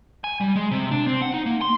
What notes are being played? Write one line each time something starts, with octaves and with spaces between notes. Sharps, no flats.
G#5
G3
G#3
C3
D4
C4
F#5
D#4
A#3
C6